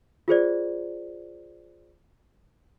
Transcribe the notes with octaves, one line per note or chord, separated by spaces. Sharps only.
F4 G#4 C5 D5